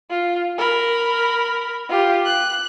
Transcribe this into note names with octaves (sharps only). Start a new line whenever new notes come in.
F4
A#4 B5
F4 G4
F#6